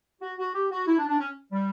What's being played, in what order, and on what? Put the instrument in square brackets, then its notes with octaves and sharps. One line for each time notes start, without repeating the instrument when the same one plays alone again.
[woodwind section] F#4
F#4
G4
F#4
E4
D4
D4
C#4
G3